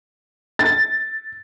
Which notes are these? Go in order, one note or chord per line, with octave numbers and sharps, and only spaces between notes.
A6